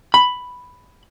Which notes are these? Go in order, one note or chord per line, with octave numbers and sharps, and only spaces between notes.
B5